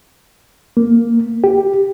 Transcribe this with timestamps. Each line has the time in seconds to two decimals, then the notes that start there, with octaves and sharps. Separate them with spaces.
0.77 A#3
1.44 G4